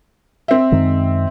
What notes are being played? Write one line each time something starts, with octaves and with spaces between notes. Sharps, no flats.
C4 E5
F#2 D#3 G#3